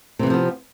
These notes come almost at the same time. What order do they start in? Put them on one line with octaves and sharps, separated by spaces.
C3 E3 C4 F3 B3